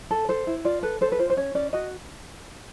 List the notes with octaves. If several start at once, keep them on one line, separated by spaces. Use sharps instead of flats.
A4
A4 C5
E4
F4 D5
A4 B4
A4 C5
B4
F4 C5
C5
C#4 C#5
C#4 D5
F#4 D#5